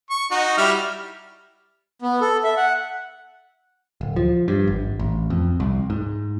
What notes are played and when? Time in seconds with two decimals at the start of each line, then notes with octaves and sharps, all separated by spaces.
0.10 C#6
0.31 D#4 F#4
0.58 G3 E4 F6
2.02 B3
2.21 A4
2.44 E5
2.57 F#5
4.01 D1
4.16 F3
4.48 G2
4.67 G#1
4.99 A1
5.30 F2
5.60 C2
5.90 G#2